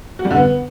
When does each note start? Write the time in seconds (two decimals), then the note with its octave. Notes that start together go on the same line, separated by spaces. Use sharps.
0.19 F#4
0.25 G3
0.31 D3
0.36 B3